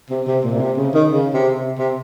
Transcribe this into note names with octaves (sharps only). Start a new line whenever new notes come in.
C3
C3
A#2
A#2
C3
C#3
D#3
C#3
C3
C3